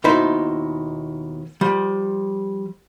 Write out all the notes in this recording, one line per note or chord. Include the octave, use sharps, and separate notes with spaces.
D#2 B2 D#4 E4 C5 B5
F3 G3